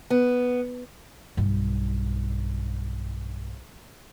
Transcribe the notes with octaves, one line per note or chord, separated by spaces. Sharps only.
B3
B1 G2